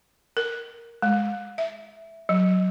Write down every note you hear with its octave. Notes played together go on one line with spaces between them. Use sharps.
A#4
G#3
E5
F#3